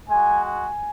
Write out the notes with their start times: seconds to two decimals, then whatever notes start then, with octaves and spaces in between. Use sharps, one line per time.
0.09 G#3 F#4 G#5
0.45 G#5